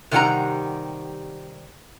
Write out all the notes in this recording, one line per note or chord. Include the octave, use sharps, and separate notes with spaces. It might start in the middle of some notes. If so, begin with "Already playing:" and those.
C3 D#3 G3 G4 F#5 A#5